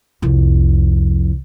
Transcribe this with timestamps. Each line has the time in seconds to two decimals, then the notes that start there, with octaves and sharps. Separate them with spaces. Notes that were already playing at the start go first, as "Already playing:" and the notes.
0.22 C2 F2